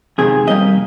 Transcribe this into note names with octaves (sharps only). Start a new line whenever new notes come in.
F2 C3 D#3 G#3 G#4
F2 C3 G3 A#3 D#5